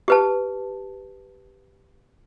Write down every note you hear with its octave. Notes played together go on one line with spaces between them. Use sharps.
G4 B4 A5